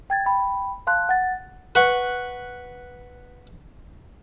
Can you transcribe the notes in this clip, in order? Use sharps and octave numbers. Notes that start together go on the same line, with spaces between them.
G5 G#6 A6
G5 B5
F5 A5 C6 F#6
F#5 A6
B4 F#5 C#6